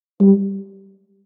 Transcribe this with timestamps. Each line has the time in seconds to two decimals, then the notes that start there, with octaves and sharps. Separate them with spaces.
0.20 G3